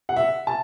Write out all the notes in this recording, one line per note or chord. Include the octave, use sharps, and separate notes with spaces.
F#5
E5
A5